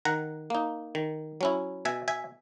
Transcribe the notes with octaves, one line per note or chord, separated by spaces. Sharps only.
D#3 F#5 A#5
A#3 D#4
D#3
F#3 C#4 E4
B2 E5 G#5
E5 G#5